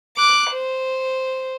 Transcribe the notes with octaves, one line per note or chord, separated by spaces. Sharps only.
D6 F#6
C5